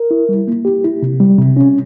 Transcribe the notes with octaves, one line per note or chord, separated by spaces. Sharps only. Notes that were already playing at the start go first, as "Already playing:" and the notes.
Already playing: A#4
E4
G3
A#3
G4
E4
C3
G3
C3
C#4